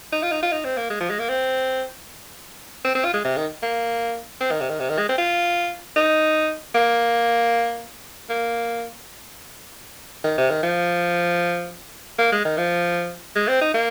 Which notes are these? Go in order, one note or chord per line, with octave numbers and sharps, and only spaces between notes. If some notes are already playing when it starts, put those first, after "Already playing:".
D#4
F4
D#4
F4
D#4
C4
A#3
G#3
F3
G#3
A#3
C4
C4
C4
F4
G#3
C3
D#3
A#3
C4
D#3
C3
D#3
C3
D#3
G#3
C4
F4
D#4
A#3
A#3
D#3
C3
D#3
F3
A#3
G#3
D#3
F3
G#3
C4
D#4
A#3